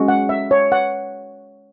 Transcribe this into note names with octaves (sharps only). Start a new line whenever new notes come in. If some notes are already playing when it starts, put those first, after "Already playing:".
Already playing: G#3 C#4 F#4
F#5
E5
C#5
F#5